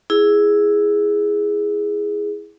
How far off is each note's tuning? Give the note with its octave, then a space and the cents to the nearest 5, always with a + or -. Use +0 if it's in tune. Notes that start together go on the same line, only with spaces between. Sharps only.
E4 +0 G#4 +0